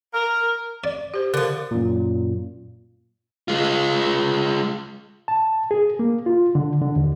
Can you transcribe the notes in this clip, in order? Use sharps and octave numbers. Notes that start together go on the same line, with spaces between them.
A#4
D5
G4 C5
D3 F3 A#4
F#2 A#2
G#3 F4
A5
G#4
A#3
F4
D3
D3
D#2